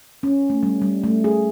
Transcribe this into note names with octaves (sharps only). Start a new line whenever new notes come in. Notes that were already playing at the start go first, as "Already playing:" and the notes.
C#4
A3
G3
G3
A3
G#4